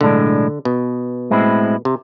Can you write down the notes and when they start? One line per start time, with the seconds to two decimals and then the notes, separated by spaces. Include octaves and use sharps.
0.01 B1 A2 D3 G#3 D4
0.65 B2
1.31 A2 G#3 C4 E4
1.85 C3